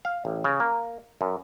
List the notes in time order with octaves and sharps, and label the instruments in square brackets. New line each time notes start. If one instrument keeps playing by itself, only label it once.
[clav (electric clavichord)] F5
A1
C#3
A#3
F#2